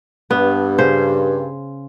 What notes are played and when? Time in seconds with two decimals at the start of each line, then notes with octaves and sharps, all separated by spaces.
0.31 G2 B3
0.78 C#3 C5